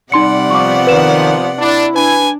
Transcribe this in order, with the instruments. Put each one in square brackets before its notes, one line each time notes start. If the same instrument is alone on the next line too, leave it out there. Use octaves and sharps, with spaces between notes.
[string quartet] C3 D5 F#5 [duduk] G3 [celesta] D#4 C6 C#7
[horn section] F3 B3 [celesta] C#6 D6
[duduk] D#3 [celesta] B4 E7
[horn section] D4 [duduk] E4
[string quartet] D4 [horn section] B4 G#5